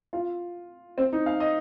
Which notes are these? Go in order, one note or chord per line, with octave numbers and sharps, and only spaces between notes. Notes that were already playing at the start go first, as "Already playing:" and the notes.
F4
C4
D#4
F5
D#5